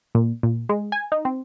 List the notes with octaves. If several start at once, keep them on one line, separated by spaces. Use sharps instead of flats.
A#2
A#2
G#3
G#5
D#4
C4